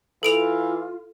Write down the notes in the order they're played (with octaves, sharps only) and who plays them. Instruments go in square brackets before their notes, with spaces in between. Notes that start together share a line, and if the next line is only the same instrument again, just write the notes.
[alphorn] E3 [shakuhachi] F4 [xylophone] A4 D7 F7